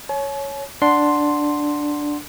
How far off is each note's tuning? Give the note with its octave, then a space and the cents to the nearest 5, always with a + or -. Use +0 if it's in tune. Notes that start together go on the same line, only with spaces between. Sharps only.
C#5 +0 G#5 +45
D4 +0 F#5 +0 C6 +0